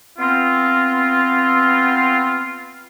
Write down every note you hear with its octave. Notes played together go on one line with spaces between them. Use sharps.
B3 C4 F4